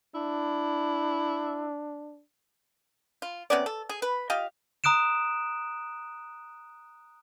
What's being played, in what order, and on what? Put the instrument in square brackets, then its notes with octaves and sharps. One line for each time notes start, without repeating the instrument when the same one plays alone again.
[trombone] D4 [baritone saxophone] E4
[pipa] F4
C3 B3 C#4 D5
A4
G#4
B4
F4 G4 D#5 F5
[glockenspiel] A#5 D#6 F#6 D7 E7